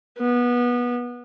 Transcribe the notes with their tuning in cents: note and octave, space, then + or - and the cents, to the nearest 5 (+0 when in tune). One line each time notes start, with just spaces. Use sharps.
B3 -20